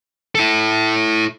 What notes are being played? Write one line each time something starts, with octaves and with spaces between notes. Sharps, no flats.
E4 A4